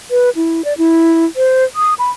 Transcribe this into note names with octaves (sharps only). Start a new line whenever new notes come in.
B4
E4
D5
E4
C5
D#6
B5